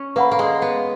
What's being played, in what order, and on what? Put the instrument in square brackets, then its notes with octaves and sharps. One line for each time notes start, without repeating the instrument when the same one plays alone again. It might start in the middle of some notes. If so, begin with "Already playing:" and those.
Already playing: [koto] C#4
[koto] A#3 [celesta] B4 F#5 B5
[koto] A#3
G#3
B3